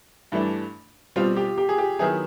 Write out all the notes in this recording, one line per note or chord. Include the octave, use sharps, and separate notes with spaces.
G2 E3 A3 D4
B2 G3 C4 F4
G4
G4
G#4
G4
D#3 F#3 B3 E4 G#4